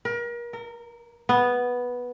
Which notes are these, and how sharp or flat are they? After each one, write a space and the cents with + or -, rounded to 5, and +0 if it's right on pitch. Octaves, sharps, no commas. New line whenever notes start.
A#4 +35
A#4 -20
B3 -5